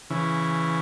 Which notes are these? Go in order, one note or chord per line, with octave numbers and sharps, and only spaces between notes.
C#3 E3